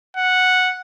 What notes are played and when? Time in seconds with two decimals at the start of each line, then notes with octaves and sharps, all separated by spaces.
0.17 F#5